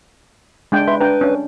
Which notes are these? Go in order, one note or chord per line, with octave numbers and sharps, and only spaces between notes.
G#3 D4 G5
B4 E5 C6
D4 B4 G5 A#5
C#4 D4